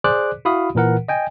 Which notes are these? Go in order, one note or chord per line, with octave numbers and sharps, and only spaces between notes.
G#4 C5 D5 D6 F#6
E4 F#4 F5 B5 D#6
A#2 E3 A#4 F#5
D#5 G5 G#5